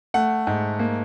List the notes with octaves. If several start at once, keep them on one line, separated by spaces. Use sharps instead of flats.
A3 F#5
G#2
A#3